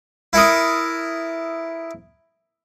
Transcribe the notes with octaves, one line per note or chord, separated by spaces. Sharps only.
E4 A4 A#4 D#6